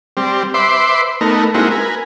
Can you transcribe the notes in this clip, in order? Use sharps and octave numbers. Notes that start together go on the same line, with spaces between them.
G3 C4
B4 C5 E5 C6 D6
A3 B3 D#4 A#4
G#3 A#3 C4 D#4 E4 F#4
A#4 B4 G#5